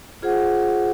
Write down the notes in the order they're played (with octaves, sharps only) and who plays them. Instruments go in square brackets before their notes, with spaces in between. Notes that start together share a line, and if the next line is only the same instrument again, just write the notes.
[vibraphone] F4 G#4 C5 F#5